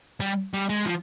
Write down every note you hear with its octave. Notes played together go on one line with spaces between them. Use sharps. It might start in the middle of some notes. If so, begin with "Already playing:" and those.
G3
G3
G#3
F3